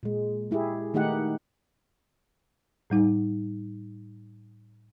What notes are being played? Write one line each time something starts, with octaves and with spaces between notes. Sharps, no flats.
A#2 G#3
G#3 E4 G4 G#4
D#3 A3 D#4 G4 F#5
A2 G3 D#4